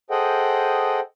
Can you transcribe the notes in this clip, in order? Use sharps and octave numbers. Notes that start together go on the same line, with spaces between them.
G#4 A4 C5 D#5 F#5 G5